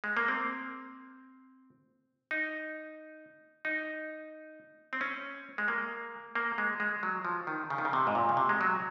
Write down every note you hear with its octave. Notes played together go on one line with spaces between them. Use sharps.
G#3
A#3
C4
D#4
D#4
C4
C#4
G#3
A#3
A#3
G#3
G#3
F#3
F3
D#3
C#3
D#3
C#3
C3
G#2
A#2
C#3
C3
G#3
F#3